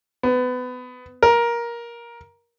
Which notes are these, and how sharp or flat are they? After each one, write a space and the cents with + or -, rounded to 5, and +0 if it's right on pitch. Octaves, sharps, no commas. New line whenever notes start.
B3 +25
A#4 +15